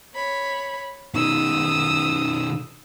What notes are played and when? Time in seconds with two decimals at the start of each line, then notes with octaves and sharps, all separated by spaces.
0.14 C#5 B5
1.14 B2 D#3 D#6 E6